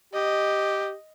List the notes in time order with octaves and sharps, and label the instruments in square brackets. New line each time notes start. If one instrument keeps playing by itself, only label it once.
[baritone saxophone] G4 [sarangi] D#5